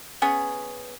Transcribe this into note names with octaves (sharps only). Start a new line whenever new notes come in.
B3 C#4 G#4